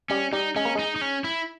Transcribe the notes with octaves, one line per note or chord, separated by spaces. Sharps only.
G3 C#4
G3 D#4
G#3 C#4
A#3
G#3 D#4
D#4
C#4
E4